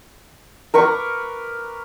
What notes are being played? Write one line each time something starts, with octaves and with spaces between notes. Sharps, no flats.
A#4 B4 C#6 D6